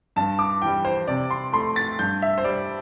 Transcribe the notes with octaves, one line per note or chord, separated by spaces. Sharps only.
G2 A5
D6
E3 G3 G5
C5
C3 D5
C6
A3 C6
A6
G2 G6
E5
C5
G3 D5